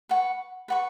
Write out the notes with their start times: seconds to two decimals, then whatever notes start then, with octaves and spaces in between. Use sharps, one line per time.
0.09 B4 F#5 C#6
0.68 B4 F#5 C#6